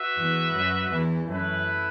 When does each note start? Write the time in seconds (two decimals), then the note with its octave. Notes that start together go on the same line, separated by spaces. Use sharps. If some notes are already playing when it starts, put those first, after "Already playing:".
Already playing: F#4 B4 E5
0.16 E2 E3
0.53 F#2 F#3
0.90 E2 E3
1.27 F#2 A3 E4 B4